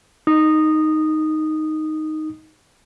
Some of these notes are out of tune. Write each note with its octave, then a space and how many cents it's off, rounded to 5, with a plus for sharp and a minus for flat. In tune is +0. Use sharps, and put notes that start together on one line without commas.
D#4 +0 D#6 -15